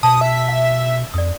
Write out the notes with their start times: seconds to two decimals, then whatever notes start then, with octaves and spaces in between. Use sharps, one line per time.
0.03 B2 A5 D#6
0.21 E5
0.48 F5
1.14 F2 D5 D#6